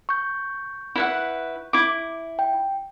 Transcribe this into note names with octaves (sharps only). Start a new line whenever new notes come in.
C#6 G6
E4 B4 F#5
E4 D6
G5